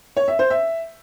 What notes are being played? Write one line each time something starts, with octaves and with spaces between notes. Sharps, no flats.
C#5
E5
C5
E5